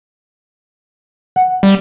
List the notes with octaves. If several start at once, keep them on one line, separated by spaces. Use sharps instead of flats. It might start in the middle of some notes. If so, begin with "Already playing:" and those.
F#5
G3